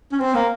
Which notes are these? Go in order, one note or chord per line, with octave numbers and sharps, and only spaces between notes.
C#4
C4
A#3